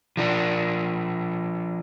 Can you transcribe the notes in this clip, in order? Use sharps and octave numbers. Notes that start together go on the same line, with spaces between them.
F3 D4